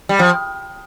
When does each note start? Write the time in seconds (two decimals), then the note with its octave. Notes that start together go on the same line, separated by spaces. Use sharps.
0.09 G3
0.19 F3